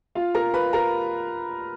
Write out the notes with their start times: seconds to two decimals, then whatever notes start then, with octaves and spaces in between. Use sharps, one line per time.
0.15 F4 F5
0.35 A#4 A#5
0.54 B4 B5
0.73 A#4 A#5